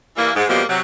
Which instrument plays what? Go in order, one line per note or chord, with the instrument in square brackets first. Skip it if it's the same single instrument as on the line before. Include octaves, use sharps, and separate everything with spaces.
[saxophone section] E3 G3 A#3
G#2
B2 D3 F3 G3 G#3 A#3
C3 F#3